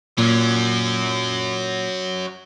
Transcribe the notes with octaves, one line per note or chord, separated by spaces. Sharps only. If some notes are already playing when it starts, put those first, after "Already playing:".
A#2 F#3 C#4